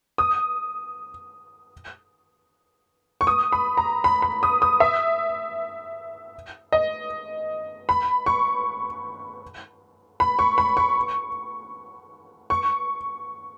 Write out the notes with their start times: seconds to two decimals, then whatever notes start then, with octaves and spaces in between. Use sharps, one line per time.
0.18 D#6
3.21 C#6
3.27 D#6
3.52 B5
3.77 A#5
4.04 B5
4.22 B5
4.43 D#6
4.62 D#6
4.80 E5
6.72 D#5
7.89 B5
8.26 C#6
10.20 B5
10.39 C#6
10.58 B5
10.77 C#6
12.50 C#6